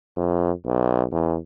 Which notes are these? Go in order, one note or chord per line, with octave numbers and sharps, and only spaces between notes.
F2
B1
E2